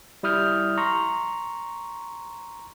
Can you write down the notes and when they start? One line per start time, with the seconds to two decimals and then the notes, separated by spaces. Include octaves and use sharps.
0.23 G3 E4 D#6 F6 G6
0.78 A#5 C6 C#6